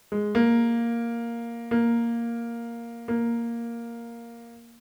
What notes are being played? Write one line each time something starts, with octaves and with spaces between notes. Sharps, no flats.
G#3
A#3
A#3
A#3